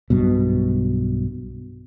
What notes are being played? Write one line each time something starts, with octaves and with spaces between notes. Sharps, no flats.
B1 G2 B2